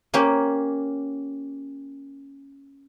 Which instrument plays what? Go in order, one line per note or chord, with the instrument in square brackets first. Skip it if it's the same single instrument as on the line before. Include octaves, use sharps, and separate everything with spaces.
[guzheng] A#3 C#4 G4